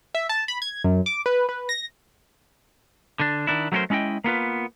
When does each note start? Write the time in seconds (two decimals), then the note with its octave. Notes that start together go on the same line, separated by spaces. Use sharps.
0.15 E5
0.29 A5
0.48 B5
0.62 G#6
0.84 F#2
1.06 D6
1.26 B4
1.49 B4
1.69 A#6
3.20 D3 D4
3.47 D#3 D4 E4
3.72 F#3 A3 C#4 F4 A#4 C5
3.90 G#3 C#4 E4 D#5 G5
4.24 A#3 B3 F4 B4